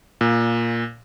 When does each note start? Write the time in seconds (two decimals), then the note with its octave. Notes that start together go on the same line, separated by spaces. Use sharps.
0.21 A#2